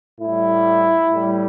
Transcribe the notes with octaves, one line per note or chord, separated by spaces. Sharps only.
A2 G3 E4
A2 G3